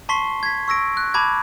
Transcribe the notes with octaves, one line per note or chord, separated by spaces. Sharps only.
A5 C6 C#6 B6 C7 G7
G#6 B6
C#6 E6 A#6 D7
F#6
A5 B5 D6 G#6